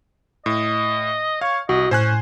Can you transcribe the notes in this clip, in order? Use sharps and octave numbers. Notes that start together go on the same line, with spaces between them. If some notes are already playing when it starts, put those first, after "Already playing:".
A2 D#5
C#5 F5
C2 F#4 D#5
A2 C#4 C5 G#5 F#6